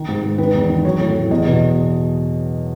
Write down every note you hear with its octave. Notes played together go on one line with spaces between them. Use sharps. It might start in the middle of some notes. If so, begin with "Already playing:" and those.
Already playing: D#3
G#2
G#2
D#3 B4
E2
D#3
F#3 C#5
A2
A2
E2 D#5
B2